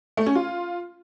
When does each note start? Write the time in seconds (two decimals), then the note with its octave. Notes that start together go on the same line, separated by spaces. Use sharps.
0.17 A3
0.26 C#4
0.35 F4